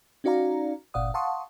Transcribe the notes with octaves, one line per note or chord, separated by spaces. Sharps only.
C#4 D#4 F#4 D5 F5 A#5
G1 A#2 D5 F5 F#5 D#6
F5 F#5 A5 C6 C#6 D#6